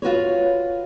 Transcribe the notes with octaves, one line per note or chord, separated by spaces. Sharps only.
F4 F#4 B4 C#5